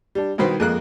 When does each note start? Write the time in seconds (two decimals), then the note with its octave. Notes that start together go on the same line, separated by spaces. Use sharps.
0.15 G3 D4
0.38 C2 B2 D#3 B4 C5
0.60 F2 G#3 A#3 A#4 F#6